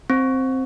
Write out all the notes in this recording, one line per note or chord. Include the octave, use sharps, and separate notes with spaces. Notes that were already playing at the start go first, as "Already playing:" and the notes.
C4